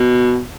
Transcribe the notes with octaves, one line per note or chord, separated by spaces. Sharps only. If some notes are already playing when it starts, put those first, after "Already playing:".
Already playing: B2